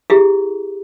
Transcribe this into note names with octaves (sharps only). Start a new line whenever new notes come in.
E4 G4 G#4